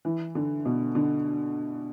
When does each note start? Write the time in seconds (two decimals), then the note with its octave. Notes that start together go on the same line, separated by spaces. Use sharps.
0.05 E3
0.35 D3
0.65 B2
0.95 D3